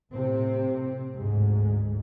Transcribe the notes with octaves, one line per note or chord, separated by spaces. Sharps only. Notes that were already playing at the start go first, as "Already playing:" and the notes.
A2 C3 C4
D2 G#2